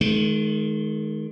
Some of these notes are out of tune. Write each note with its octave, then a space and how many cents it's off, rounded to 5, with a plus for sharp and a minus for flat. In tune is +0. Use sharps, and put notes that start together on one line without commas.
D#3 +10 G#3 +45